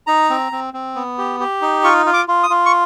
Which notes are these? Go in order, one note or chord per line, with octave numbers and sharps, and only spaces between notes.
D#4 A#5
C4
C4
C4
B3
G4
G4
D#4
F4 C#6
F4
D6
F4
D#6
F4
C#6